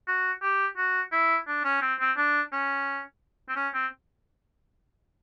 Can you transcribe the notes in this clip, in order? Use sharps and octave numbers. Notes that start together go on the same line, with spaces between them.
F#4
G4
F#4
E4
D4
C#4
C4
C4
D4
C#4
C4
C#4
C4